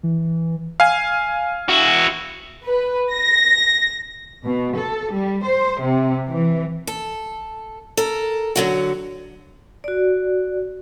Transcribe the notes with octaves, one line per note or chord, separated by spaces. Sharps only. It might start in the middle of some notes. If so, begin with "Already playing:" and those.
E3
F5 G#5
E4 F#4
B4
A#6
B2
A4
G3
C5
C3
E3
A4
A4 A#4
D3 F#3 F#4
F#4 D5